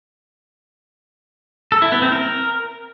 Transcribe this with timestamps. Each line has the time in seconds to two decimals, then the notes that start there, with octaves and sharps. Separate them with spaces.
1.72 A4
1.82 E4
1.92 B3
2.02 C4
2.12 A#4